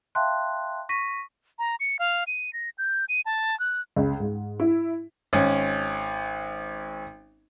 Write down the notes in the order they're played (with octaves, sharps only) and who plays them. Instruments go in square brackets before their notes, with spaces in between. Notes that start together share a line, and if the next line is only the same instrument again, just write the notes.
[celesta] E5 F5 G5 A5 C6 F#6
C#6 A#6 B6 D#7
[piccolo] A#5
C#7
F5
D#7
A#6
G6
D#7
A5
F#6
[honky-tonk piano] C#2
G#2
E4
[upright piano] G#1 C#4